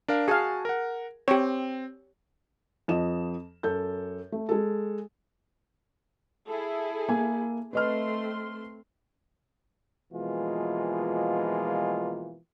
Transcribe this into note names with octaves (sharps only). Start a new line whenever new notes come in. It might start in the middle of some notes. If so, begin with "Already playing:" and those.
D4 A#4 F5
F#4 G#4 F5 G#5 A5
A#4 F#5
C4 G4 C#5
F2 F3 D#5 E7
F#2 A4 G6
A3
G#3 A4
E4 G#4 A4
A#3 G#5
A3 C4 B4 D#5 C6 F6
B2 E3 F3 G#3 A#3 F4